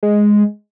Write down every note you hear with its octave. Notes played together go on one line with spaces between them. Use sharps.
G#3